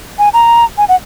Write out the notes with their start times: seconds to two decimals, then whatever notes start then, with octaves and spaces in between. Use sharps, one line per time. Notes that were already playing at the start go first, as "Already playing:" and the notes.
0.19 G#5
0.33 A#5
0.78 G#5
0.89 F#5